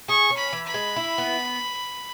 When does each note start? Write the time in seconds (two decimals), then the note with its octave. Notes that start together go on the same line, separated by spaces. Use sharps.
0.08 G#4 C#6
0.30 C#4
0.38 B5
0.52 E3
0.67 B5
0.74 G#3
0.96 E4
1.18 B3